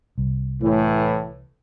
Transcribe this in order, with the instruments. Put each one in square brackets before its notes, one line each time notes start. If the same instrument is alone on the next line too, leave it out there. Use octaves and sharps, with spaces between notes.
[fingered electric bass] C2
[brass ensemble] A2 E3